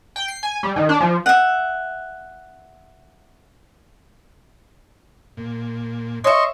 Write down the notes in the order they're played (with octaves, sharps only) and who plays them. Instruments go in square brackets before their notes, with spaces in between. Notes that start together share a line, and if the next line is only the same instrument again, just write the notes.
[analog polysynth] G5
C7
G#5
G3
D#3
D4
F3
[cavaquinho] E5 F#5
[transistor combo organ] A#2
[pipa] C#5 E5 [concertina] D#5 C6 C#6